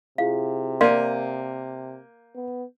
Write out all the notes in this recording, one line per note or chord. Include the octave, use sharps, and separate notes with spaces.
C3 E4 F4 G#4 F5
A#3 D5 F5 C6 G6 D#7
B3